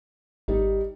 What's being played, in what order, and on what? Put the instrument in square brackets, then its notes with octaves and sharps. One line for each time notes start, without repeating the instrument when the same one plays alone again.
[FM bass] G#1 [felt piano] G3 D#4